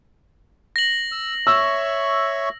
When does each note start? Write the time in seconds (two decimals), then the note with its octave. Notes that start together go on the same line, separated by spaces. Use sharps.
0.76 A#6 F#7
1.12 E6
1.47 C#5 E5 C#6 E6